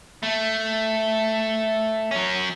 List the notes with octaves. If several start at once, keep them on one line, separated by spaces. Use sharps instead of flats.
A3
F#3 C#4